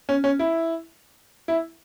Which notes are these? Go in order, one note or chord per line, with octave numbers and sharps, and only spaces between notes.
C#4
C#4
E4
E4